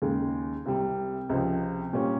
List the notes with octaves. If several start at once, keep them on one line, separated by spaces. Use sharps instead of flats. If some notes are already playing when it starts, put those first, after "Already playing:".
D#2 C#3 G#3
C2 C3 G3
C#2 C3 F3
A#2 G3 C#4 G4